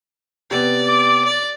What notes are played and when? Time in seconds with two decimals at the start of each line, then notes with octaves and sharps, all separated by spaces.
0.51 C3 B3 D5
0.88 D6
1.26 D5